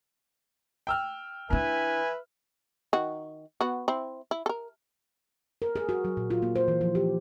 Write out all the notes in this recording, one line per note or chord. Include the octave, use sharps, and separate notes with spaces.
G5 E6 F6
D4 E4 B4 E5 G#5
D#3 F#4
B3 F#4
C4 E4
E4
A4 A#4
A#4
G#4
F#4
F#3
A#2
F4
A#3
C5
E3
F3
G4